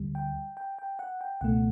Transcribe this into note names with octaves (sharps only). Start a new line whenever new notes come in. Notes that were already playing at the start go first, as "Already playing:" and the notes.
Already playing: D2 D3 G3
G5
G5
G5
F#5
G5
C#2 B2 A3 F#5